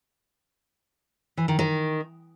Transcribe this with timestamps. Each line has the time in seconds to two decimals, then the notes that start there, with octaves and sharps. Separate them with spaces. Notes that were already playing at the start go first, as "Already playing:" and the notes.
1.37 E3
1.48 D#3
1.59 D#3